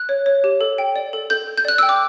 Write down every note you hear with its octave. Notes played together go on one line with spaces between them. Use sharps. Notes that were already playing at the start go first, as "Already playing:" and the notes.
Already playing: F#6
C#5
C#5
G4
A4
G5
D5
A4
A4 G6
A4
G6
D5 F#6
G5 E6
D6